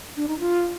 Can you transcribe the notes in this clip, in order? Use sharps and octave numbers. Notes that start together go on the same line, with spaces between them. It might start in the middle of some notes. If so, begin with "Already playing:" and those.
D4
D#4
F4